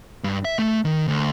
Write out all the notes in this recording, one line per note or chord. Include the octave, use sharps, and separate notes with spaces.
G2
E5
A3
D#3
D2